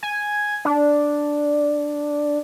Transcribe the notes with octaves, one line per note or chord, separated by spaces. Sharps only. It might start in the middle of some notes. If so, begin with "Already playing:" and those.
G#5
D4